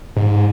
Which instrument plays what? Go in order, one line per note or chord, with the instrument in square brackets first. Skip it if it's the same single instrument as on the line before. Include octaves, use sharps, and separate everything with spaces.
[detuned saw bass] G#2